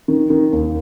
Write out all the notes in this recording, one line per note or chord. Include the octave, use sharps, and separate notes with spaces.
D#3
D#3
D#2